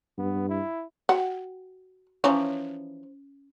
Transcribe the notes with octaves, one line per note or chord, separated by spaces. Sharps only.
G2 B3
E4
F#4 F#5 G5
E3 F3 C#4 C#5